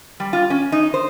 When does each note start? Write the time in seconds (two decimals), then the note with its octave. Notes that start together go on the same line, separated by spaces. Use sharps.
0.20 G3
0.33 F4
0.50 C#4
0.72 D#4
0.94 C5